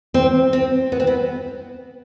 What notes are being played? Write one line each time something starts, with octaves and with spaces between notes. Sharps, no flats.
C4
C4
B3
C4
B3